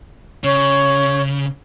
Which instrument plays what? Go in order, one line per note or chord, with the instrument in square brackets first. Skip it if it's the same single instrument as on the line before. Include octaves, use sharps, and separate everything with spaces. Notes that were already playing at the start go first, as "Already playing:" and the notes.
[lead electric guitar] C#3 [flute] C#5